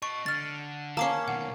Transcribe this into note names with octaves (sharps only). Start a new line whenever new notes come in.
D#5 A5 C#6
D3 F6 A6
A#3 C#4 A5 D6 C7
B2 D#3 F#5